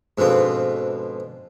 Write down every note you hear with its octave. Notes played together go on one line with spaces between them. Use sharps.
G#2 B2 D3 F3 C4